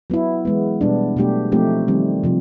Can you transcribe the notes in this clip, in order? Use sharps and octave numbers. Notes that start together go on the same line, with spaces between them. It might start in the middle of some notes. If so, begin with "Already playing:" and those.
F#3 B3 E4
E3 G#3 B3
B2 G3 B3 D4
B2 F#3 A3 D4 G4
F3 A3 C4 D#4 G4
D#3 G3 C4
C3 F3